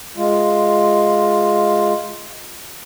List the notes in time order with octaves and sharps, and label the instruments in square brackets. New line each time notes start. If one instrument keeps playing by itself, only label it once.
[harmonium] G#3 F4